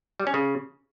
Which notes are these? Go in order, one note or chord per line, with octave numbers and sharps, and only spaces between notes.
G3
C#4
C#3